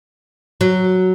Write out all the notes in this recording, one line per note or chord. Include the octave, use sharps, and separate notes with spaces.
F#3